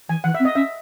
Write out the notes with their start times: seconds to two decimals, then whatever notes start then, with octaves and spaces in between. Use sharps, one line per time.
0.09 E3 G#5
0.24 E3 F#5
0.34 E5
0.40 C4
0.45 D#5
0.55 C#4 E5